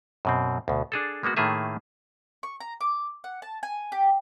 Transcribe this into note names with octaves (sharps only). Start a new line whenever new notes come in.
F#2 B2 C4
D2 B2
D4 G#4 A4
G#3 A#3 B3 F#4
A2 D#3 A3 A#3 G#4 E5
C#6
A#5
D6
F#5
A5
G#5
G4